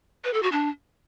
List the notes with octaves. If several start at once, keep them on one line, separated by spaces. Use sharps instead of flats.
B4
A4
F#4
D4